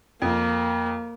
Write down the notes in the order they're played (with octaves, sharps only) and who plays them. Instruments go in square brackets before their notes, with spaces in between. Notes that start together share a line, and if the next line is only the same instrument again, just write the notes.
[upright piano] F2 [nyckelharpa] A#3